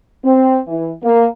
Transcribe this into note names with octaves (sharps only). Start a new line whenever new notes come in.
C4
E3
A#3